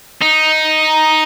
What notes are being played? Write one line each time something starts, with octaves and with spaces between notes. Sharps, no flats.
D#4